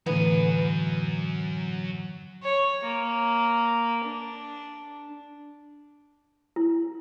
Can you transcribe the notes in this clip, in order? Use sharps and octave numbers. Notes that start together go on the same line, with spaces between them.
A2 D3 E3 F#3 B3 G#5
C#5
A#3
D4
E4